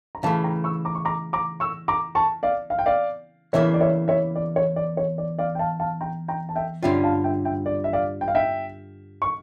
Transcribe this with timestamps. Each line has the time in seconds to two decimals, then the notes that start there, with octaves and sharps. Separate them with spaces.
0.15 A#5
0.23 C#3 E3 A3 F5 A5
0.44 G5 A#5
0.64 C#6 E6
0.85 A#5 D6
0.95 C#6
1.05 A#5 D6
1.33 A#5 D6
1.60 C#6 E6
1.88 A#5 D6
2.15 A5 C#6
2.43 D5 F5
2.70 F5
2.79 G5
2.86 D5 F5
3.53 E2 C#3 E3 A#3 E4 C#5 E5
3.74 D5
3.81 C#5 E5
4.08 C#5 E5
4.36 D5
4.56 C#5
4.76 D5
4.97 C#5
5.18 D5
5.38 D5 F5
5.55 G5
5.59 F5 A5
5.80 F5 A5
6.01 G5 A#5
6.28 G5 A#5
6.49 A5
6.56 E5 G5
6.83 G2 D3 G3 C#4 F4 E5 G5
7.04 F5 A5
7.24 E5 G5
7.45 E5 G5
7.66 D5
7.84 E5
7.93 D5 F5
8.21 G5
8.28 F5
8.35 E5 G5
9.22 C#6